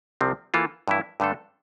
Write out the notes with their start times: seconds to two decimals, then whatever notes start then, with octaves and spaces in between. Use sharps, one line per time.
0.21 C2 C3 F3 C4
0.54 E3 A#3 F4 A4
0.88 G2 E3 A3 E4
1.20 G2 D3 A3 D4 A4